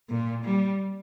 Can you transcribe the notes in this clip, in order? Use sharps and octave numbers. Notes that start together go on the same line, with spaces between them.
A#2
G3